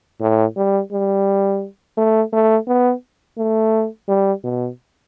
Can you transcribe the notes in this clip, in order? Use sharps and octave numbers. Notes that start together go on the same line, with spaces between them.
A2
G3
G3
A3
A3
B3
A3
G3
B2